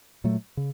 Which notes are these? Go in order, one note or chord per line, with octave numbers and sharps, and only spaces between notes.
A#2 F#3 A3
C#3